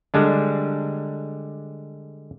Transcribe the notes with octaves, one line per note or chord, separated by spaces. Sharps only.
D3 G3 G#3 D4